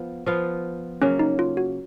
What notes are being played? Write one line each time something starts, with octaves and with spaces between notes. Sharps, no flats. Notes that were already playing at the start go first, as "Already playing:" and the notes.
Already playing: F3 B3 F4
F3 B3 F4
C#3 F#3 A#3 C#4
D#4
F4
F#4